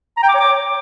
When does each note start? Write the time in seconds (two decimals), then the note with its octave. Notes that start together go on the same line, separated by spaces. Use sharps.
0.17 A#5
0.23 G5
0.29 D6
0.34 C#5
0.40 D6